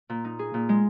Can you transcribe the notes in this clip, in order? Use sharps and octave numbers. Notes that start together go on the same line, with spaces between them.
A#2
D#4
G#4
A#2
G#3